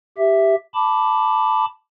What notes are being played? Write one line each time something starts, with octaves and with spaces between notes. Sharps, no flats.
G4 E5
A5 B5 D6